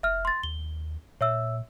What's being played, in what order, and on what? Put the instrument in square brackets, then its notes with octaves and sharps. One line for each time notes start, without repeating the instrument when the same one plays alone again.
[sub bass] F1 [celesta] E5 F6
[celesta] C6 A6
[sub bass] D#2 [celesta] G7
[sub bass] A#2 [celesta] C#5 E5 E6